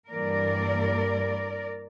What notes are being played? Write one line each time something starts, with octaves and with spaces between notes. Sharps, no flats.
G2 E3 A#3 A#4 D5